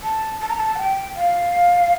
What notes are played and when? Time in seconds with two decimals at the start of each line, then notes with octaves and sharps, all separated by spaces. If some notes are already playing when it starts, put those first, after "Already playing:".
0.03 A5
0.41 A5
0.49 A#5
0.57 A5
0.75 F#5
0.79 G5
1.16 F5